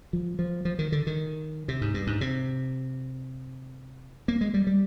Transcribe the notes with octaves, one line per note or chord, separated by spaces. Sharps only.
F3
F3
F3
D#3
D3
D#3
C3
G#2
G2
G#2
C3
A#3
G#3
G3
G3